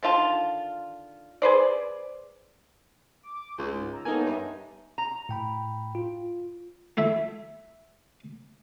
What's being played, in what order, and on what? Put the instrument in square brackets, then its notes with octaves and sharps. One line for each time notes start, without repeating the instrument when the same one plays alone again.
[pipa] D3 D#3 F4 A5
G#4 B4 C5 D5
[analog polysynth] D6
[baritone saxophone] C#2
[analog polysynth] G#2
A#5 E6
[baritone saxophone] A#3 [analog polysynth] B3 A4 C#5 [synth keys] D#4 G#5
[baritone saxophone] G2 [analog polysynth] E5
[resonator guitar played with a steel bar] A#5
[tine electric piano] A2 G5 B5
F4
[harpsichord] A3 E4 E5